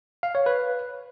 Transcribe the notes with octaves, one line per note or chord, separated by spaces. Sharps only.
F5
C#5
B4